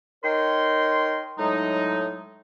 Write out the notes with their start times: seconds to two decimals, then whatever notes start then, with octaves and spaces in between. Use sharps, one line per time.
0.24 D#4 A#4 C#5 G5 C6
1.39 A2 F#3 G#3 D#4